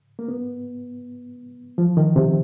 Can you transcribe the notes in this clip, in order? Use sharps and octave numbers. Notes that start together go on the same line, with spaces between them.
A#3
B3
F3
D#3
C3